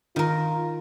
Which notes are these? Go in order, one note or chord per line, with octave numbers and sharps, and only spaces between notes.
D#3 F4 A#4